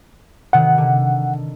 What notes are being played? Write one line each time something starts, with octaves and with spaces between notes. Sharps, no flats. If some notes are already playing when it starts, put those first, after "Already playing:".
C3 D#3 F#5
D3